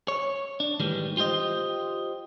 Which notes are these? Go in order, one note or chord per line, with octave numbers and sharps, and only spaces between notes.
C#5
D4
A2 D#3 E3 G3 G#3
F4 G4 C5 D#5